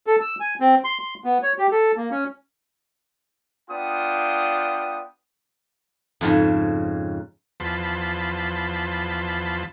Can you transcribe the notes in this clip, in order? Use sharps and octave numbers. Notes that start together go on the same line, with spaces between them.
A4
E6
G#5
C4
C6
C6
B3
C#5
G4
A4
A#3
C#4
B3 D4 F4 G5 D#6
F2 G#2 C#3
E2 F3 A5 B5 C6